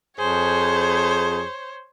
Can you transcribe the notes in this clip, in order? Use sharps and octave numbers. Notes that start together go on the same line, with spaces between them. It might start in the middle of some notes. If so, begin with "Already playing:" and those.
F2 G#4 C5 C#5